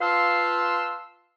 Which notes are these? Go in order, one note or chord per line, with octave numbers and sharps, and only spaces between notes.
F4 B4 F5 A5 C6 E6